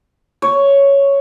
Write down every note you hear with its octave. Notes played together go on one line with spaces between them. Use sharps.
C#5